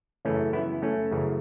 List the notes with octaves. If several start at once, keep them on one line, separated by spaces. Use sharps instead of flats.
F#2 C#3 E3 A3 C#4
B3 E4
A3 C#4
F#2 C#3 E3